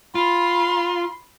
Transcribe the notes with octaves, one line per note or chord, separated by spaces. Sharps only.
F4 B5 C6